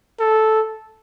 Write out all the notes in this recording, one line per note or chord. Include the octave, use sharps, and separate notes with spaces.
A4